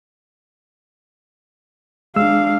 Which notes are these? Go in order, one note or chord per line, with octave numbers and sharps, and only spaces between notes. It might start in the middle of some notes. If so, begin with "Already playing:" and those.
G#3 D4 F5 E6